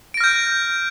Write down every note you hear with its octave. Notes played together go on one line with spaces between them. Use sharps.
F6 G6 A#6 D7